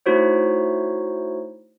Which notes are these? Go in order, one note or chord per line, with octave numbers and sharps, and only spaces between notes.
A3 D#4 E4 F#4 C5 C#5